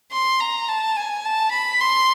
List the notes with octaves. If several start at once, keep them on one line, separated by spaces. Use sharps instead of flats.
C6
A#5
A5
G#5
A5
B5
C6